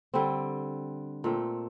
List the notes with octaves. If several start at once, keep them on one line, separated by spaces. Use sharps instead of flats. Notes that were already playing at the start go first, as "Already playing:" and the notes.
D3 G3 C4
A#2 A3 C4